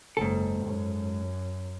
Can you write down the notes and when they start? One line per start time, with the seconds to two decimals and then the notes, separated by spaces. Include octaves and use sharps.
0.17 F#1 G#2 A4
0.65 F#2